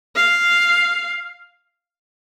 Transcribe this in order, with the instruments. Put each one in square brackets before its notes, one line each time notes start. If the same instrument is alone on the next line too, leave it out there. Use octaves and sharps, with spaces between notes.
[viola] F5